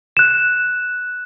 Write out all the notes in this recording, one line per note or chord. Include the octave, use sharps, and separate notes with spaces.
F#6 E7